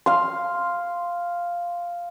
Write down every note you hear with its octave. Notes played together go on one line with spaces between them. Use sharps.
F5 C6